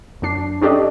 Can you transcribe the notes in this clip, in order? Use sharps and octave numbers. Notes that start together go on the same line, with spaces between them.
F#2 F#3 D4 C7
C#4 D4 G4 A4 D5 D#5